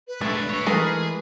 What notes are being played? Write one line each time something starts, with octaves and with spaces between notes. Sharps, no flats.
B4
G#3 A3 D4
C#5 E5
E3 G#3 A3 G#4 A#4